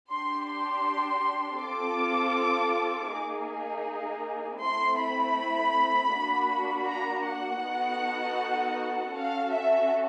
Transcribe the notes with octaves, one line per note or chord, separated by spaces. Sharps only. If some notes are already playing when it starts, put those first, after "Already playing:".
D4 G4 C6
C6
C4 F4 A4 D6
A#3 D#4 G#4
A3 C4 E4 C6
B5
A#3 D4 F#4
A#5
F#5
B3 D#4 F#4 A4
C#4 F#4 A4 F5
E5